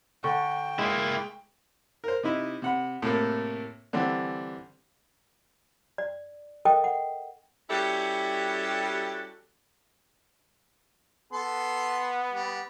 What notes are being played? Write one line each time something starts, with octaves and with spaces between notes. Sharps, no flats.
D3 G5 C#6
G#3 A#3 E4
A#4 C5
C3 D#4 E4
C3 F#5 B5
A2 C3 A3 A#3
D3 E3 G3 C4
D5
A4 A#4 D#5 G5
F#5
G3 C#4 E4 F#4 G4 A4
B3 A4 C6
G3